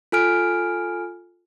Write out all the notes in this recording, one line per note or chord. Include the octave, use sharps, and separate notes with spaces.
F4 A4 G#5 F6 D7